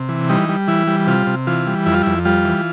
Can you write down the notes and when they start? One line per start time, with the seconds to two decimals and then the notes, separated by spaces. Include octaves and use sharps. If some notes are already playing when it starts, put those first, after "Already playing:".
Already playing: C3
0.09 E3
0.29 G3 D#4
0.49 G3
0.68 E3 E4
0.87 G3
1.07 C3 F4
1.27 C3
1.47 E3 F4
1.67 G3
1.86 F2 E4
1.94 F4
2.03 F2 E4
2.25 G3 F4
2.45 E3